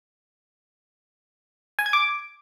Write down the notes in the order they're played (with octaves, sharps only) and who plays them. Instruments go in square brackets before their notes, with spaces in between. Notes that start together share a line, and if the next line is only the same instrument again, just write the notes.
[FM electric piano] G#5
G#6
D6